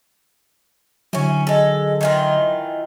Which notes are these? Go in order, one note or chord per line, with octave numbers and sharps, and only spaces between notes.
D3 E3 F#3 C#4
G#3 A4
D#3 E3 F4